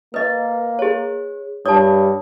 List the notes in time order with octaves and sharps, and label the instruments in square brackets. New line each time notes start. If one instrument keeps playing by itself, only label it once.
[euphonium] A#3 [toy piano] B4 D#5
[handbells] G#4 C#5
[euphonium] G2 [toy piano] C#5 A5 [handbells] D#6